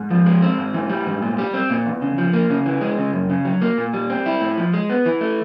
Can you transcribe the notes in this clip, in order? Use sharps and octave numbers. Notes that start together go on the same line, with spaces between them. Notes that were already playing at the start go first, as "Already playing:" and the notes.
Already playing: G#2
F3
G#3
C4
G#2
E3
G3
G#2
A#2
G3
C4
A#2
E2
C#3
F3
A#3
C#3
E3
G#3
C#3
F#2
C#3
F#3
A#3
A#2
G3
C4
E4
A2
F3
G#3
B3
E3
A3